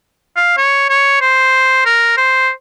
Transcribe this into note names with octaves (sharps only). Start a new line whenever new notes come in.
F5
C#5
C#5
C5
A#4
C5